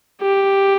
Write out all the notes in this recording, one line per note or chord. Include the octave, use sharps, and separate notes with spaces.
G4